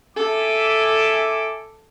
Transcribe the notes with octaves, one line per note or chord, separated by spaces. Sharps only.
A4 E5 G#5 D6